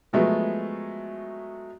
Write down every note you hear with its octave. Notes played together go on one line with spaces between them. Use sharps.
F3 F#3 G#3 A3 B3